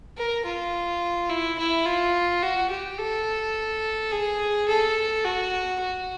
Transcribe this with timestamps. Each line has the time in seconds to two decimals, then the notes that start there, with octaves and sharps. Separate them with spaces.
0.17 A#4
0.45 F4
1.30 E4
1.58 E4
1.86 F4
2.43 F#4
2.70 G4
2.98 A4
4.12 G#4
4.68 A4
5.24 F#4
5.81 F#4